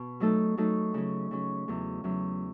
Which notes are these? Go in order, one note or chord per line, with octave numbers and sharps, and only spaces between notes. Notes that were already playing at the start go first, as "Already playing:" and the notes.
Already playing: B2
F#3 A3 D#4 A4
F#3 A3 D#4 A4
C#3 F#3 C#4
C#3 F#3 C#4
E2 C#3 F#3
E2 C#3 F#3